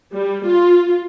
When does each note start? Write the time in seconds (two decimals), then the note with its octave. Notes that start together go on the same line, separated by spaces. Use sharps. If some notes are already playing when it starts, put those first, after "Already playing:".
0.12 G3
0.46 F4